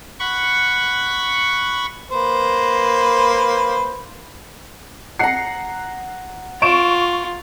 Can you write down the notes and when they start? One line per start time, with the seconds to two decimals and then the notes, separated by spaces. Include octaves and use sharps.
0.20 F#5 B5 C#6
2.11 A#3 B4 C5
5.19 F#5 A#5 C7 C#7
6.62 F4 C#6 D7 E7